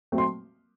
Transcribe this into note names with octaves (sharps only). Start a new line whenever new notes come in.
F#3 A3 C4
C6